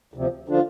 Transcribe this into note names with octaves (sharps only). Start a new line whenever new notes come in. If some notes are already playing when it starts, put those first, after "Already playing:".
D2 C3 F3
D3 F3 D4 F4